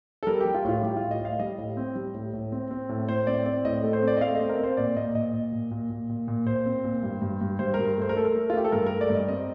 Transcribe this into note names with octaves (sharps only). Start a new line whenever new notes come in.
A4
G3 A#4
G3 G4
F4
A2 F4
G3 G4
F4
A2
D#5
A2 F5
G3 D#5
A2
C4
G3
A2
A2
C4
C4
A2
A2 C5
C4 D5
C4 D5
A2 D#5
A3
C5
C4
D5
D#5
A3 F5
D#5
C4
A#4
C4 C5
A#2 D5
A#2 D#5
A#2 D#5
A#2
A#2
A#2
A#2
A#2
A#2
A#2 C5
C4
A#2
G2
G2
G2
G2 C5
G2 A#4
A3 C5
A#4
A3 A4
A#4
A3
F4
A3 G4
A4
G2 A#4
A3 A#4
D5
G2 D#5
C4 D#5